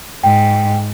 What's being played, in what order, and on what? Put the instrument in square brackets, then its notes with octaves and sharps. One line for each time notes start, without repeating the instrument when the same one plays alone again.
[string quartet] G#2 [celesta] G5